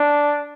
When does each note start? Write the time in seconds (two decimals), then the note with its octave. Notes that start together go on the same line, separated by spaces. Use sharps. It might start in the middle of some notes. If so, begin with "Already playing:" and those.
Already playing: D4